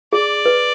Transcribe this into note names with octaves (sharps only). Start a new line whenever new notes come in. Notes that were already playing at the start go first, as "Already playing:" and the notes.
G#4 D5
B4